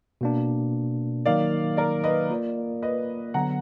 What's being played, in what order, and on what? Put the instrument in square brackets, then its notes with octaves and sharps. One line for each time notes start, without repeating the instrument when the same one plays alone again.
[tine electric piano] B2 A#3 D4
[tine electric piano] D#3 F#3 A#3 D#4 A#4 [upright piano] D5 F5
[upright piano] A#4 D5
B4 D#5
[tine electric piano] A#3 F4 A#4 D5
[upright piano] B4 D#5
[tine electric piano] D3 F#3 B3 [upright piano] F#5 A#5